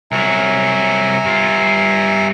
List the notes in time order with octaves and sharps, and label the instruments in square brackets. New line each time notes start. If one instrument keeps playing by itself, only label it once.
[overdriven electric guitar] C2 F#3 [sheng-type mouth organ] E5 G#5 A#5
[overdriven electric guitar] G2 F4